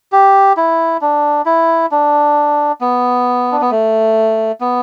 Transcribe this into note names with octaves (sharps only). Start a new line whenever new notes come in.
G4
E4
D4
E4
D4
B3
D4
B3
A3
B3